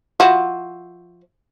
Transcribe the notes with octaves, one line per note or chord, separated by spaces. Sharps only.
F3 E4 F#4